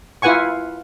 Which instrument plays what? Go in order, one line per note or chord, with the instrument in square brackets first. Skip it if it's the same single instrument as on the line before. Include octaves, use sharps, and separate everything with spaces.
[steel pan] E4 F4 B4 F#5 G#5 C#6